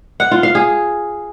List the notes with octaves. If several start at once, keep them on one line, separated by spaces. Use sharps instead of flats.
F#5
F4
F5
G#4